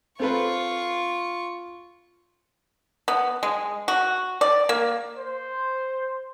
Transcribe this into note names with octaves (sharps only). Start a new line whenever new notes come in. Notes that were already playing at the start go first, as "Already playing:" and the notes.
C4 F4 A4 B4 C#6
B3
G#3
F#4
D5
A#3
C5